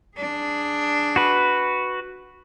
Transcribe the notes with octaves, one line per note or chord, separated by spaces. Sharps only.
D4 G#4
F#4 B4